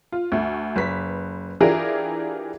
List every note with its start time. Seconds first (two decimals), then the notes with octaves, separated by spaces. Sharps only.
0.12 F4
0.32 D2 A3
0.76 F#1 B4 B6
1.61 E3 D4 F4 G4 G#4 A#4